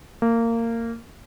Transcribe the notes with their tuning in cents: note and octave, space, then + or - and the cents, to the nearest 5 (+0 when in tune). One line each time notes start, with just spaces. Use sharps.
A#3 -20